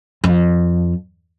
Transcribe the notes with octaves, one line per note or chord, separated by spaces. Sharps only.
F2